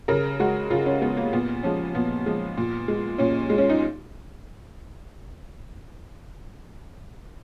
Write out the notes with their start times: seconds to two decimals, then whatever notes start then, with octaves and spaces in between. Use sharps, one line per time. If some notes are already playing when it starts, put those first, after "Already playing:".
0.08 C#3 A#4
0.40 G#3 F#4
0.70 C#3 F4
0.86 C#4
1.02 G#3 B3
1.17 A#3
1.33 A#2 B3
1.63 F3 G#3 C#4
1.95 A#2 B3
2.26 F3 G#3
2.57 A#2
2.88 G#3
3.18 A#2 C#4
3.50 G#3
3.58 C#4
3.70 D#4